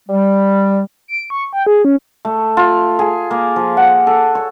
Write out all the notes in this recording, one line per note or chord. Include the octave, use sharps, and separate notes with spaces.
G3
D7
C#6
G5
G#4
C#4
A3
F4
G#4
A#3
F3
F#5
A4
C#5